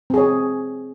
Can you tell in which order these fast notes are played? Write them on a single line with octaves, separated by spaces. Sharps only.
C4 G#4 C#5